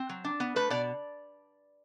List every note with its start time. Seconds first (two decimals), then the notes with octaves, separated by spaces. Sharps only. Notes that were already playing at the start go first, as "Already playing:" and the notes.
Already playing: C4
0.09 F#3
0.24 D4
0.40 B3
0.56 A3 B4
0.70 B2 D5